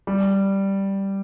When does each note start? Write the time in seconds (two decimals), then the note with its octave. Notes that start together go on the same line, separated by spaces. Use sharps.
0.07 G3